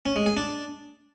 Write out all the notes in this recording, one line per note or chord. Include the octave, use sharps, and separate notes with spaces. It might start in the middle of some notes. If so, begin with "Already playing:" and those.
C#4
G#3
G#4
D4